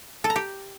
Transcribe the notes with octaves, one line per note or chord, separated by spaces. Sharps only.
A4
A#5
G4